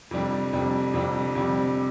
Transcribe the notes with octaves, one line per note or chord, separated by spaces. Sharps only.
F2 C3 G3 D4
F2 C3 G3 D4
F2 C3 G3 D4
F2 C3 G3 D4